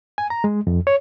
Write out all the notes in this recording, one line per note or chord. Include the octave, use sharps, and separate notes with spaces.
G#5
A#5
G#3
F2
C#5